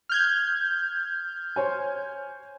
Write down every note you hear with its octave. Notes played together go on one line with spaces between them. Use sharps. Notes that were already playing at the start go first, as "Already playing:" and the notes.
F6 G6 G#6
C5 C#5 G#5